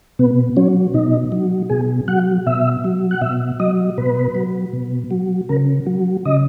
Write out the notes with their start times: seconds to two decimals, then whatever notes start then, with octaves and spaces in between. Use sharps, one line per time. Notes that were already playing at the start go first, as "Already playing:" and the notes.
0.19 B2 B3
0.57 F#3 C#4
0.94 B2 D#4
1.32 F#3
1.70 B2 G#4
2.08 F#3 F#5
2.46 B2 E5
2.84 F#3
3.11 F#5
3.21 B2 E5
3.60 F#3 D#5
3.98 B2 B4
4.35 F#3
4.73 B2
5.11 F#3
5.49 C#3 A#4
5.87 F#3
6.25 C#3 D#5